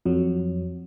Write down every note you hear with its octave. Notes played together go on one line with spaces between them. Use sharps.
F2 F#3